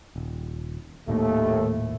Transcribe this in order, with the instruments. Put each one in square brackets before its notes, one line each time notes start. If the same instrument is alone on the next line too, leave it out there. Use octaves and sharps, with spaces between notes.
[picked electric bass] D#1
[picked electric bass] D#1 A2 A#3 [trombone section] D#2 A3